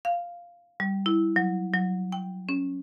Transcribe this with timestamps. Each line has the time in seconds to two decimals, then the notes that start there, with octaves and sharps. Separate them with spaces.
0.05 F5
0.80 G3
1.06 E4
1.36 F#3
1.74 F#3
2.12 G5
2.49 C#4